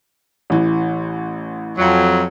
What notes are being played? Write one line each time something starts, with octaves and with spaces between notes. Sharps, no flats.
A1 E3
F2 F#3